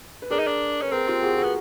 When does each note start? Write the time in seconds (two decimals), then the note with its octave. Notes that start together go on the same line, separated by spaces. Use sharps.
0.22 B4
0.31 D4 G#4 A#4
0.39 D#4
0.47 D4
0.82 C#4 B4
0.92 C4 G#4 A#4
1.07 F4 G4
1.22 F#4 G#4
1.38 F#4 G#4
1.43 B3